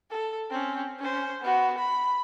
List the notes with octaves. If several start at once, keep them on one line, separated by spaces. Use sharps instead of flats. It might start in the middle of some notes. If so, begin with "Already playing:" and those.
A4
C4 C#4
C#4 C5
B3 F#4
B5